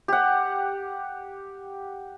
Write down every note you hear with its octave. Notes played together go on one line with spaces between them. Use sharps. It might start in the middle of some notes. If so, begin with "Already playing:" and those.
G4 F#5